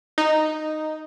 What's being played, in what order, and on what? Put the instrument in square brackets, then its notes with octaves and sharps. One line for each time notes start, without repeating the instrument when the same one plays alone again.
[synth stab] D#4